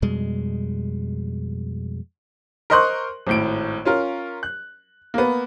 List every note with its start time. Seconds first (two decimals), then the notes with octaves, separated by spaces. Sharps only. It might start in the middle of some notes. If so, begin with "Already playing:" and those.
0.02 F2 B2 G3 G#3
2.70 A#4 C5 D#5 C6 C#6 F#6
3.27 G#1 A2 D7
3.85 C#4 F4 A#4
4.43 F#6
5.14 A#3 B3